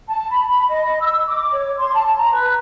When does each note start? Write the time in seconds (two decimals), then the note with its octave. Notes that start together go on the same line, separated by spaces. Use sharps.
0.07 A5
0.30 B5
0.48 B5
0.69 D#5
0.99 E6
1.27 D6
1.52 C#5
1.76 C6
1.93 A5
2.18 A#5
2.33 B4